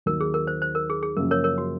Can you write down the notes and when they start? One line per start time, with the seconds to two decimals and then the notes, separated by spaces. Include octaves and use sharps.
0.06 D#2 D#3 F#3 A#4
0.20 G#4
0.34 A#4
0.47 C5
0.62 C5
0.75 A#4
0.90 G#4
1.03 G#4
1.17 F#2 C#3 F3 A#3 A#4
1.31 A#4 C#5
1.44 A#4 C#5
1.58 F#4